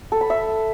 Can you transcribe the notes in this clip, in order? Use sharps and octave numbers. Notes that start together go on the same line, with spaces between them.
A4
B5
E5